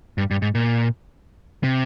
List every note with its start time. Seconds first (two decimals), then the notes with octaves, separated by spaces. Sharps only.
0.18 G2
0.31 G2
0.42 G#2
0.55 A#2
1.63 C3